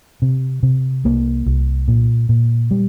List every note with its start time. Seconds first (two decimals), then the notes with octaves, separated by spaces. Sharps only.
0.22 C3
0.63 C3
1.04 C2 A#3
1.46 C2
1.88 A#2
2.29 A#2
2.71 G3